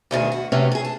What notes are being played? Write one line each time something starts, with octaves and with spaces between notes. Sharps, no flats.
D2 B2 D#3 G#4
F#4
C3 A3 B3 C#4
G#4 A4
A5